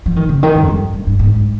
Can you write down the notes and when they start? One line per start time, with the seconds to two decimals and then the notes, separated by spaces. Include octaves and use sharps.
0.06 F3
0.16 D#3
0.29 C#3
0.43 D#3
0.55 G#2
0.63 F2
0.68 G2
0.93 G2
1.07 G2
1.19 G#2